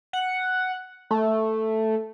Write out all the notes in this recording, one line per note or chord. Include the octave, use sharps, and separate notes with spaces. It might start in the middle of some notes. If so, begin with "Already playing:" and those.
F#5
A3